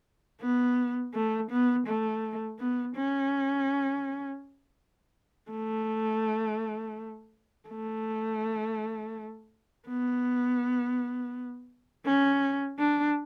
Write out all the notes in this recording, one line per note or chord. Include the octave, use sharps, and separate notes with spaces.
B3
A3
B3
A3
B3
C#4
A3
A3
B3
C#4
D4